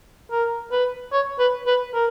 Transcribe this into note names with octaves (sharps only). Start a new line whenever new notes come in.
A#4
B4
C#5
B4
B4
A#4